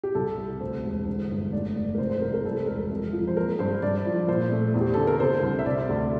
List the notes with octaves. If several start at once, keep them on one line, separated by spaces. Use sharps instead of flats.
G4
C2 A4
C2
D2 C5
E1
D3
G1
F1 D5
F1
A#4
C3 C5
C5
C2 A#4
A#4
G3 A4
E1 A#4
F2
F3
C5
A#3 A#4
G2 C5
G2 D5
F3
A#2 C5
A3
E2
G4
D3 A4
A#4
C3 C5
C2
E5
C3 D5
D2